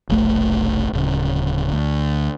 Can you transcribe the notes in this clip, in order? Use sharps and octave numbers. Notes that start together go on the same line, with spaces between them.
F1 B1 A3
D1 C#3
D2